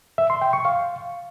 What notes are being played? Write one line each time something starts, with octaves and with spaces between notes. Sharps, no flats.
E5
C6
G5
C#6
F5